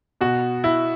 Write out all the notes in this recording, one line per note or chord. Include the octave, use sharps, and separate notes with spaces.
B2 F#4
E4